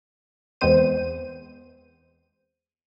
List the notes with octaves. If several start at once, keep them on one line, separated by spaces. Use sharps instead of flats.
E2 G#3 B3 C4 C5 D#7